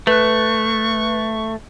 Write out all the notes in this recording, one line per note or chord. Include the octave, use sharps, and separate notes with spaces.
A3 B4 C#6 F#6